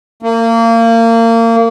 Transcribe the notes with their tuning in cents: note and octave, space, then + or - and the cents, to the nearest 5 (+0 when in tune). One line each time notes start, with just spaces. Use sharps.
A#3 -30